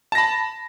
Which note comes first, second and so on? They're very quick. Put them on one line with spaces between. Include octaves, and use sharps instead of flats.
A5 A#6 B5